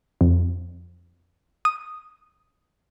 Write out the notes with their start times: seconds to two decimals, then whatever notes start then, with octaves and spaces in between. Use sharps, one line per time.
0.21 F2
1.65 D#6